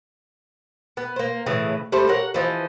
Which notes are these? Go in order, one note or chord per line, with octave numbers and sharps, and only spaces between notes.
B3
A#3 C5
A2 C#3 E3 G#4
G3 A3 C5
A#4 C#5 F#5
E3 F3 D#5